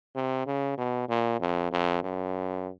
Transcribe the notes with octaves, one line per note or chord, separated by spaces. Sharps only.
C3
C#3
B2
A#2
F2
F2
F#2